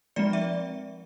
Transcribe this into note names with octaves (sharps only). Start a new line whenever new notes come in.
F3 G#3 C4 D5
E5